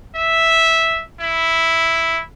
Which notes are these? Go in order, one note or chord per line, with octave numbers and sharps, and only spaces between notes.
E5
E4